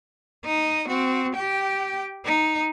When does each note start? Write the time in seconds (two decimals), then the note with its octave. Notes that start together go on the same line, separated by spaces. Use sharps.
0.45 D#4 D#5
0.88 C4 F#4
1.35 G4 G5
2.25 D#4